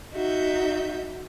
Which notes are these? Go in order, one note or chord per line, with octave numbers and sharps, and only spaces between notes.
D#4 F#4 E5 G6